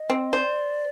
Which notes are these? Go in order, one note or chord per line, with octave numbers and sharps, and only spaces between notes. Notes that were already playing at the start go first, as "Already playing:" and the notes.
Already playing: D#5
C4
C5 D5